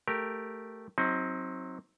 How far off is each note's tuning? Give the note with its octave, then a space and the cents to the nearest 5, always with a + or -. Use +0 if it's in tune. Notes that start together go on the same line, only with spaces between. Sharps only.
A3 +0 G4 +0 A#4 +0
F#3 +0 C4 +15 D#4 +30